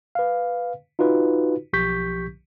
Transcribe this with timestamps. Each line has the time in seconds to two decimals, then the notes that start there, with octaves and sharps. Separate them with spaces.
0.15 B4 F5
0.99 D#4 F4 F#4 B4
1.73 B1 F3 G4 C#6 G6 B6